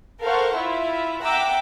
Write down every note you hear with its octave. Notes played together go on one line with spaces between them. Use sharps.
A4 A#4 C5 F5 F#5 C#6
E4 F4 E5
E5 F#5 G5 A#5 D6 E6